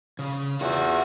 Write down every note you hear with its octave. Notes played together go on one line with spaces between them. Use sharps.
C#3
E2 F4 F#4 F#5